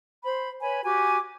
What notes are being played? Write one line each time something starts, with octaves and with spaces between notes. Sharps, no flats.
C5 B5
B4 C#5 G#5 B5
F#4 G4 G#5 D6